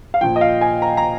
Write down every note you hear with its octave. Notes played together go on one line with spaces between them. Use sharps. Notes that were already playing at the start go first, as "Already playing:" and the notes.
F5
A#2 F3 G5
D#5
F5
G#5
A#5
A#5